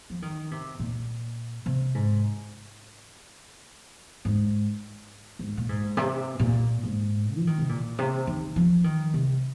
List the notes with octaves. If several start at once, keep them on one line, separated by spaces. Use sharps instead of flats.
F3
D#3
C3
A#2
C3
G#2
G#2
G#2
A#2
G#2
C3
A#2
G#2
F3
D#3
C3
A#2
C3
D#3
F3
D#3
C3